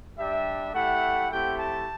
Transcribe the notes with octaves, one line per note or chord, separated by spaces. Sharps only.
G3 D4 G4 E5
A3 E4 G4 F#5
A3 C4 E4 G4 G5
A5